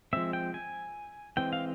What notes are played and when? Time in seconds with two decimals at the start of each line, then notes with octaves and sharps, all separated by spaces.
0.13 F3 G#3 C4 E5
0.33 G5
0.54 G#5
1.37 E3 G#3 C4 G5
1.53 F5